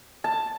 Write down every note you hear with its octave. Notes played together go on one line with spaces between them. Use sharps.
A5